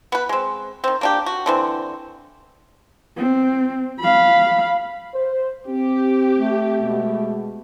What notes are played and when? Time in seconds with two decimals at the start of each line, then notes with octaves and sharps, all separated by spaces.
0.12 B3 B4
0.29 G#3 C4
0.84 D#3 C4
1.01 A#3 D4 G4
1.26 F#4
1.46 D3 E3 C4
3.17 C4
4.00 F5 B5
5.14 C5
5.67 C4 G4
6.36 A3
6.81 B2 G#3